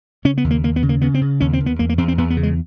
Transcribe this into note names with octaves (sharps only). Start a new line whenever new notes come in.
C#3 C#4
B3
D#2
A#3
D#2 A#3
B3
C#3
A#3
C#3 B3
C4
C#3
D#2 C#4
C4
D#2
B3
E2 A#3
A#3
E2 C4
C4
E2 B3
B3
C#3
G#3